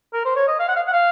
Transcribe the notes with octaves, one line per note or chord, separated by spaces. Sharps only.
A#4
C5
C#5
D#5
F5
F#5
F5
F#5
F5